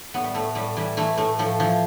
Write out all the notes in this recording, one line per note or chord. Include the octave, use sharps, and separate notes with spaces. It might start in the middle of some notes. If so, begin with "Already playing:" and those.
A2 B3
G3
A2 A3
A2 G3
E3 G3
E3 A3
A2 A3
A2 F3
E3 F3